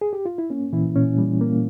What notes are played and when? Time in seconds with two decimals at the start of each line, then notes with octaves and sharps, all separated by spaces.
0.01 G#4
0.13 G4
0.26 F4
0.38 E4
0.50 A#3 C#4
0.73 A#2 E3 E4
0.95 A#2 C#4
1.18 G3
1.41 A#3